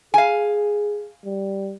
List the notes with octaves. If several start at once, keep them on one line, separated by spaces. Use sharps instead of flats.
G#4 F5 G#5
G3